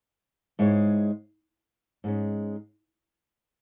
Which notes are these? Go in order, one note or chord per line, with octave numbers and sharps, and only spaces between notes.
G#2 G#3 E4 C#5
G#2 G#3 C#4